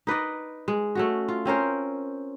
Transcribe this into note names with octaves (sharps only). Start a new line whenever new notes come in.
D#4 B4 D5 D#5
G#3
A3 C#4 F#4
F4
C4 C#4 A#4 C5